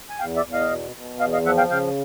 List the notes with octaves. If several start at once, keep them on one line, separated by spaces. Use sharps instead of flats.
G#5
E2 F5 G5
D5 E5
E2
D#5 F5
B2
B2
E2 D#5 F5
D#5 F5
F3 E5 F#5
F5 G5
C#3 F5 G5